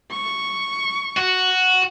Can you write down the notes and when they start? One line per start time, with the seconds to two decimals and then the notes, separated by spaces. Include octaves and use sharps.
0.12 C#6
1.17 F#4